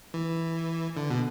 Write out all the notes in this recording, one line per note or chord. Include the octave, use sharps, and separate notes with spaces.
E3
D3
B2